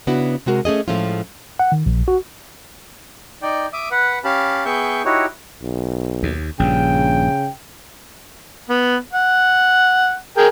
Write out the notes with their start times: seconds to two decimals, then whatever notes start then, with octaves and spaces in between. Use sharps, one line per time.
0.07 C#3 B3 D4 E4 F#4
0.46 C3 G#3 F#4 A#4
0.65 A3 C#4 G#4 D#5
0.88 A2 F3 G#3 A3 C#4 F4
1.59 F#5
1.72 D#3
1.86 A#1
2.08 F#4
3.42 D#4 D5 G5
3.73 E5 D6 D#6
3.91 B4 F#5
4.24 C#4 G4 F5 A5 B5
4.65 B3 G#4 E5 G5 C#6 G6
5.05 D#4 E4 F#4 G4 C#5
5.62 B1
6.23 D#2
6.60 A#1 G2 C#3 G5
8.70 B3
9.13 F#5
10.37 G#4 A#4 G5